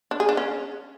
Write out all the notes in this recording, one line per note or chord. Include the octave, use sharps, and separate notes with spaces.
D4
G#4
D4
C#4